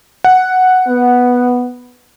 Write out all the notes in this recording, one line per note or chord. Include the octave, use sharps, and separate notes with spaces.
F#5
B3